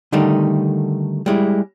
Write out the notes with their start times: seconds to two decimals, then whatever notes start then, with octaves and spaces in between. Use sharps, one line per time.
0.12 D3 D#3 G3 A3 D#4
1.26 G3 G#3 E4